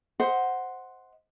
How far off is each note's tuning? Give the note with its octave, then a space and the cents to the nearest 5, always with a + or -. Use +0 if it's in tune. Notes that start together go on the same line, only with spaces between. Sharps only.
C5 +0 D#5 +35 F#5 +0